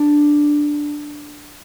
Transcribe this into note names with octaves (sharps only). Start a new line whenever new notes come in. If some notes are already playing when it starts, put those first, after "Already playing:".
Already playing: D4